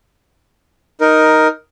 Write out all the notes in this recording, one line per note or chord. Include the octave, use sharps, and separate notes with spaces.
D#4 A#4